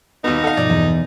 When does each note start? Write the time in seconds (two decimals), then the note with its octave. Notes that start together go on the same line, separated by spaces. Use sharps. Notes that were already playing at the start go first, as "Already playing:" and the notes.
0.24 D#2 B2 B3 D#4
0.44 A4 F5 F#5
0.57 G2 B2 F3 D5
0.70 E2